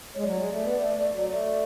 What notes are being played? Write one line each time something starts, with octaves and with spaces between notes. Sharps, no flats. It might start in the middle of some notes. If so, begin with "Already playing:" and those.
G#3 C#5
F#3 D5
G#3
A3
B3
A3
A3
F#3
A3 D5